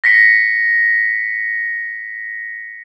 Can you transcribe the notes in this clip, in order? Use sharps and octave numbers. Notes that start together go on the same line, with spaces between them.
A#6 B6 C#7